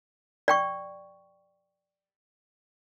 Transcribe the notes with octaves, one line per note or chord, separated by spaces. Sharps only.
D5 G5 C#6